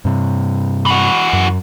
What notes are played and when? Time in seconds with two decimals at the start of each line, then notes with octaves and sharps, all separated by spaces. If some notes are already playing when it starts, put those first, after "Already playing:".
0.05 G2 C3
0.86 E3 F#4
1.33 F#2